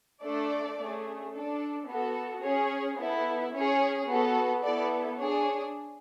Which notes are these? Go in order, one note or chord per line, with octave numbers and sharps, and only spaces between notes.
A3 D4 A4 D5
A3 C#4 G#4
D4 A4
B3 F#4 A4
C#4 G#4 C#5
B3 E4 A4
C#4 G#4 C#5
B3 F#4 A4
B3 E4 A4 D5
D4 G#4 C#5